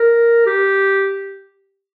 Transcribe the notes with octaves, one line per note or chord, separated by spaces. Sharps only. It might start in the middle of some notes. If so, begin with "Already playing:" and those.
Already playing: A#4
G4